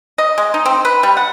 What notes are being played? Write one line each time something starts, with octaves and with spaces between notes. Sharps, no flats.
D#5
G#3
D#4
C4
B4
G3
F#5